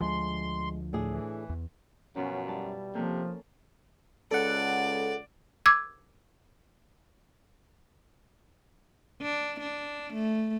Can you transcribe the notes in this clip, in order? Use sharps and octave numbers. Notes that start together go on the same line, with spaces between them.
D2 F3 G#3 C6
A2 D4 G#4
E3
E2
F#2 B2 F3 C#4
G3 E4 A5
C3 F3 A#3 C#4 A4
C#2 A4 D5 F#5
D6 E6 G#6
D4
D4
A3